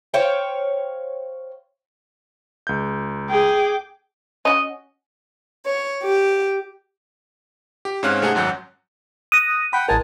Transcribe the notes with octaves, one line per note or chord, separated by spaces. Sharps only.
C5 C#5 F5 G5
C#2 G6
G#4 G5 D6
C#4 E4 F#4 D#5
C#5
G4
G4
G#2 C4 C#4 F5 F#6
C3 A3 D#4 G#4 F#5 G#5
G#1 F#2 F#3 F#5 G6
D#6 F#6 A#6 D#7
F#5 G5 B5
A1 G#3 A#4 G#5 A5